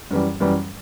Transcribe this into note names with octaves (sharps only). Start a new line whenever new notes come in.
F#2 E3 G3
F#2 E3 G3